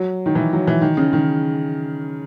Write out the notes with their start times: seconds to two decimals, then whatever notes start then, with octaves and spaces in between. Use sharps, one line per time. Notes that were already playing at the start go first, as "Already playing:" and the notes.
Already playing: F#3
0.26 D#3
0.35 E3
0.53 F#3
0.68 E3
0.81 D#3
0.97 C#3
1.13 D#3